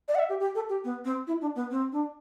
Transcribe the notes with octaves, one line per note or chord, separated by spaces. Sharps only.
D5
F#5
E5
G4
G4
A4
G4
B3
C4
E4
D4
B3
C4
D4